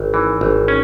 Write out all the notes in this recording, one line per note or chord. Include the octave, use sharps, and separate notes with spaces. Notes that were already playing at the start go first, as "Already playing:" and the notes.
Already playing: G#1
E3
G#1
C#4